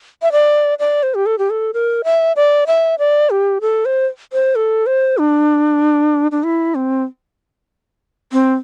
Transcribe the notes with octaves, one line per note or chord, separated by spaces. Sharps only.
E5
D5
D5
C5
G4
A4
G4
A4
A#4
E5
D5
E5
D5
G4
A4
C5
C5
A4
C5
D4
D4
E4
C4
C4